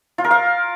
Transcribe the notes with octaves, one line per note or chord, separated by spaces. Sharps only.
F4
A#4
F5